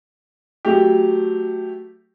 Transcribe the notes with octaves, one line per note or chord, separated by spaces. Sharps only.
F#3 A3 G4